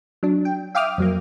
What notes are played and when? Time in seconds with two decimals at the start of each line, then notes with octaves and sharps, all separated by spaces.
0.23 F#3 D4
0.45 G5
0.75 E5 F5 G5 D6 D#6 F6
0.98 F2 F#3 A#3